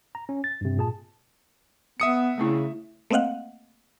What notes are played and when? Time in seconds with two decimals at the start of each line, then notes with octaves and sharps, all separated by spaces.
0.15 A#5
0.29 C#4
0.44 A6
0.61 G2 C3
0.78 A#2 G#4 A5
2.00 B3 E5 D#6 C#7
2.38 C#3 A3 C4 E4
3.10 A3 A#3 C4 D#5 F5 F#5